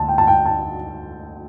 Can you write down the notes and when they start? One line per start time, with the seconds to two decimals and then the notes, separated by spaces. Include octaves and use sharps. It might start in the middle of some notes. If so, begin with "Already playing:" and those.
Already playing: D2 A5
0.08 G5
0.18 A5
0.27 G5
0.45 A5